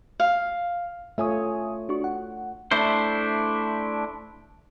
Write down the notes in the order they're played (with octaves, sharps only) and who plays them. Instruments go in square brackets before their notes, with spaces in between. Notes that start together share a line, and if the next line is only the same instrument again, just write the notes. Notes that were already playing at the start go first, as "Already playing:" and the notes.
[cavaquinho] F5
[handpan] A3 F4 C#5 [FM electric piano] E5 G#5 D#6
[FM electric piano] D4 F#4 C#6
F#5
[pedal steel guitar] A3 D4 E4 C5